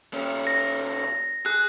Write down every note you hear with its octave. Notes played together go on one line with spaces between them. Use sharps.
A#2 C#4
A#6
G#4 F#6